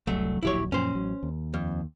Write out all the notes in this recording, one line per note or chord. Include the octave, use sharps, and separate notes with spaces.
F1 C2 F#3 A3
D1 A#1 F#3 E4 G4 C#5
F#2 A#2 F3 C#4 C5
A1 F#3
D#2
F2